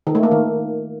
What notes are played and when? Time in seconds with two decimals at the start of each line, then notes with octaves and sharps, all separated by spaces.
0.07 D#3
0.15 A3
0.23 A#3
0.31 D#3